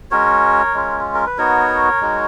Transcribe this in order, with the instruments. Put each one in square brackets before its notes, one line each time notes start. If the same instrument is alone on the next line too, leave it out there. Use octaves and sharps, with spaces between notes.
[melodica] G#3 C#4 F#4 A#4 C#5
G#3 C#4 F4
A#4
B4
B3 D#4 F#4 A#4 C#5
G#3 D#4 F#4